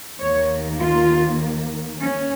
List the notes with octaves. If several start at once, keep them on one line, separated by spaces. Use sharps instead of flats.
D#2 D#3 A#3 C#5
F4
C#4